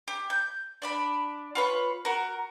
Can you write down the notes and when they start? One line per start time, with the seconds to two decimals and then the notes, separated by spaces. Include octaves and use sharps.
0.08 G4
0.30 G6
0.82 D4 D5 B5
1.55 F4 B4 C#5
2.05 F#4 A#4